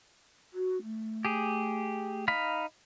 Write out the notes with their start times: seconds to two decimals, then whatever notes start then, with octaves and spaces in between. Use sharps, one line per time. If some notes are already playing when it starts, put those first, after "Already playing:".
0.53 F#4
0.83 A3
1.25 G4 G#4
2.28 D#4 F5 B5